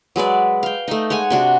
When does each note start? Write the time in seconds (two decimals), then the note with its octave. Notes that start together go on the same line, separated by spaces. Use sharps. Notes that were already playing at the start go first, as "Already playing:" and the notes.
0.16 F#3 G#3 B4 D5
0.63 F5 G5
0.88 A3 D#4
1.10 G#3 C#5 F#5 G#5
1.30 C3 D4 F#4